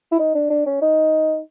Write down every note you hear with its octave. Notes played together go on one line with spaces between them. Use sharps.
E4
D#4
D4
D4
C#4
D#4